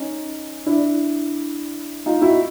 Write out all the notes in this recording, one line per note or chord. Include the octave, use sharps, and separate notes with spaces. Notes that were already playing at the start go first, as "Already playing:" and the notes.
Already playing: C#4 D#4
D4 E4
D#4 F4
E4 F#4